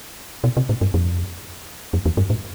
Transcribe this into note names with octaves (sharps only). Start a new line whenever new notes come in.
B2
C3
A2
G2
F2
F2
E2
G2
A2